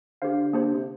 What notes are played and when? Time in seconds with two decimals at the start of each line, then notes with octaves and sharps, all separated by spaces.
0.22 D3 G4 C5 F5
0.53 A#3 D4 G4 C5
0.73 C3